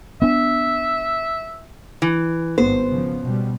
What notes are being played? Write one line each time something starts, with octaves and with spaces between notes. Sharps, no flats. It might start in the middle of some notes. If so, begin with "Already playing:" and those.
B3 D4 E5
E3
G#1 G2 B3 C5
C#3 F3
B2 G3